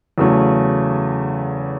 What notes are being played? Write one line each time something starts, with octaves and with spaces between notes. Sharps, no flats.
E2 C#3 F#3 A3